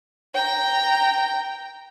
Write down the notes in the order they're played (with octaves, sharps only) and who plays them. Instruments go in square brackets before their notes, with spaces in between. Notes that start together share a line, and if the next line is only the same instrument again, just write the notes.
[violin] G5 A#5